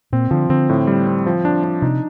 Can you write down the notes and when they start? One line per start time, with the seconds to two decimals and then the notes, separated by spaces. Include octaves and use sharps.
0.13 A#2 C4
0.31 D3 F3
0.49 D3 C4
0.69 A2
0.87 G3
1.07 C4
1.26 F3
1.45 D4
1.64 D4
1.82 C3 D#4